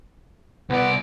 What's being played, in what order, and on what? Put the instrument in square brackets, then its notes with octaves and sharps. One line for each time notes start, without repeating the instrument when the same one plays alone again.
[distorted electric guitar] C2 D5 [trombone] B3